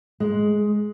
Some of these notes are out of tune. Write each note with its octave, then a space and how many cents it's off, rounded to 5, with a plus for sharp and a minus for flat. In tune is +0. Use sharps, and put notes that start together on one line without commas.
G#3 +10